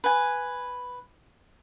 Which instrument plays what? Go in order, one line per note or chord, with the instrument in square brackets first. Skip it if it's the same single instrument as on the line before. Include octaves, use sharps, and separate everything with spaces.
[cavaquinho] B4 G#5